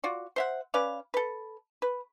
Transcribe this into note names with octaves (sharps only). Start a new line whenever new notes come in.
F4 F#4 D5
C5 E5 F#5
C#4 B4 D5 F5
A4 B4
B4